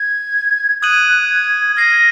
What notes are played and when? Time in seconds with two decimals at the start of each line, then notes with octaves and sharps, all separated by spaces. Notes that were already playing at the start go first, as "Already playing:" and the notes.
Already playing: G#6
0.82 D#6 F#6 G#6 D#7 F#7
1.29 G#6
1.77 F6 A#6 C7 D#7